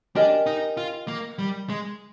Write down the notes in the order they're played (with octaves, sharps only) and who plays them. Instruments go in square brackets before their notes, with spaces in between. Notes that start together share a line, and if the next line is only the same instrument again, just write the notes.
[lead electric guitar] D4 [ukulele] G4 A#4 D#5 G#5
[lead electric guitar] D#4
F4
A#3
G3
G#3